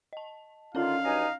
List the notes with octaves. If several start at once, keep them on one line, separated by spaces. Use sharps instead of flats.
D#5 A5
D3 D#3 C#4 F4 C#5 F5 A#5
G2 F#3 D#4 G#5 A#6